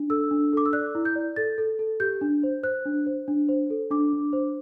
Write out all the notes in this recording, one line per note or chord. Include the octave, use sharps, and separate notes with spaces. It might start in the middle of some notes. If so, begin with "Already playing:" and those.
Already playing: D4
A4 E6
D4
A4 D6
E6
D5 F#6
E4
G6
D5
A4 A6
A4
A4
G4 G6
D4
C5
C5 F#6
D4
C5
D4
C5
A4
D4 D6
D4
C5